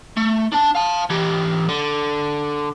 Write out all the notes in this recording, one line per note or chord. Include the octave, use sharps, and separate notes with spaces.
A3
D4 A5
F5 A5
E3 G4
D3